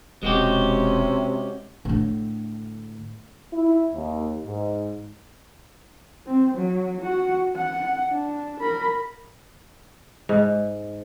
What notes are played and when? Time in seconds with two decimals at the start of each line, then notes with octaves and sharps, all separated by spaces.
0.23 E1 C3 G#3 C#4 F#4 G4
1.85 A2 D3
3.53 E4
3.94 D#2
4.45 G#2
6.26 C4
6.55 F#3
7.01 F#4 F#5
7.56 F#5
8.10 D4
8.61 A#4 B5
10.29 G#2